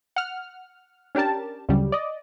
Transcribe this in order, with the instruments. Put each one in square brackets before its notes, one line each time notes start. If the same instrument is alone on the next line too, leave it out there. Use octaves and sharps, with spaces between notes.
[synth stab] F#5 F6
C#4 D4 G4 A#4 A5
D2 C#3 F#3 G3
D5 D#5